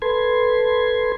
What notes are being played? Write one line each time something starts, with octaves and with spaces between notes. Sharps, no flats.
A4 B4 C6 G#6